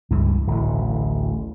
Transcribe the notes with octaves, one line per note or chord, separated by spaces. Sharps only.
C#2 G2 E3
D1 A1